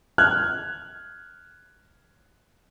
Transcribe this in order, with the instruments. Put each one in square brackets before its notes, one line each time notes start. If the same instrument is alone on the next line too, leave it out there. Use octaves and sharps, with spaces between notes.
[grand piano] F6 F#6 G#6